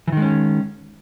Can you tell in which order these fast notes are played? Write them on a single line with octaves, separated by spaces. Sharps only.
E3 D#3 G#3 C#4